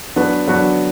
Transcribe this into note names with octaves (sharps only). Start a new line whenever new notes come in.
F#3 B3 D4 F#4 B4
F#3 B3 D4 F#4 B4